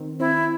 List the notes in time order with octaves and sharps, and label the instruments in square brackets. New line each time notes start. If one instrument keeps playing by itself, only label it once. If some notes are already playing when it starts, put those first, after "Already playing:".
Already playing: [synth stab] D#3 C4
[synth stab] C4 [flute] E4